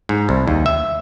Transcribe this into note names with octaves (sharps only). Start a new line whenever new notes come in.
G#2
C2
D#2
E5